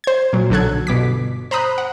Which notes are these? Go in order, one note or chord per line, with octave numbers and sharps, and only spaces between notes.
C5 G#6
A#2 F#3
B1 D3 F#3 A4 F#6 G#6
G1 B2 D6 B6
C5 A#5 B5 D#6 F#6
F#5